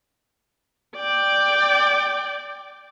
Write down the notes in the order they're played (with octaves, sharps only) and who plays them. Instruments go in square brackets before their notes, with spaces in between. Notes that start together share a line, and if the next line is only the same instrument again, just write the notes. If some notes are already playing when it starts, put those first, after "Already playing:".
[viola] D5 G5